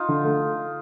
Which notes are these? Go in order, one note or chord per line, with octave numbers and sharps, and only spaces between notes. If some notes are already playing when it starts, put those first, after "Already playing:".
Already playing: D#4 F4
D3
A3